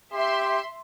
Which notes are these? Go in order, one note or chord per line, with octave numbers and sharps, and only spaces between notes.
G4 E5 C6